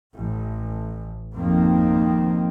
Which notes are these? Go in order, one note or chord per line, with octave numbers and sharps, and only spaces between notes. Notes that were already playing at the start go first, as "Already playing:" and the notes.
A1
G#1 F2 D#3 A#3 C4